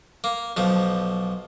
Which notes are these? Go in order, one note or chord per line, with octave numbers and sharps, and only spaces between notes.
A#3
B1 F3